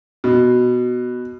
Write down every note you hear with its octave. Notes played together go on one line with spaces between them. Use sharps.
B2